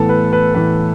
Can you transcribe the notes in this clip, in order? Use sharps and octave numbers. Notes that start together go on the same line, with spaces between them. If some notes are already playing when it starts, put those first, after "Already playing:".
Already playing: A2 E3 B3 A4
B4
B4
A2 E3 B3 B4